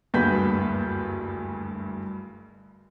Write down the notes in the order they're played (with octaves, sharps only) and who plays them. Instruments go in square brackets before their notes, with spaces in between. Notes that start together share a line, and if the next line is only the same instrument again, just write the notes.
[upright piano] F#1 D2 G2 B4 G6 B6